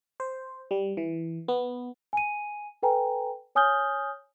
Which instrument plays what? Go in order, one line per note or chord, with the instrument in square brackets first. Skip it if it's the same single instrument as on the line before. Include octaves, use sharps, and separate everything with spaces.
[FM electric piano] C5
G3
E3
B3
[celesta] G#5 D#7
A4 B4 G5 G#5 A#5
C#5 G#5 D#6 F6 G6 G7